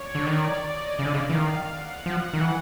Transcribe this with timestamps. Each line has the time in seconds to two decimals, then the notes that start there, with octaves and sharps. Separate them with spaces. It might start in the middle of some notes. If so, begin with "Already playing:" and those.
Already playing: C#5 D5
0.15 D3
0.27 D#3
0.63 D#5
0.98 C#3 F5
1.05 D3
1.14 C#3
1.30 E3
1.34 D#3
1.70 F#5
2.06 F3
2.33 D#3
2.41 E3